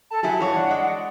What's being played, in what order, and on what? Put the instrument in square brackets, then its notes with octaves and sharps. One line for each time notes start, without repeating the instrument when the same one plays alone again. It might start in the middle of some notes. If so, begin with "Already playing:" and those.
[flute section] A4 [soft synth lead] A5
[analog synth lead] F#3 [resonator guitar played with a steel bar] E4 G4 G#4 [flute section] F#5
[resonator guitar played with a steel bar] G2 C#5 [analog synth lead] E3
[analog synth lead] D4
[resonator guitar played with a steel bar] G#3 [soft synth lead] D#5